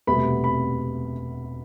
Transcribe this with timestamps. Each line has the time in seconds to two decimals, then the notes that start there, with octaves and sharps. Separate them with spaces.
0.07 E1 D2 C3 G3 B3 B5
0.44 B5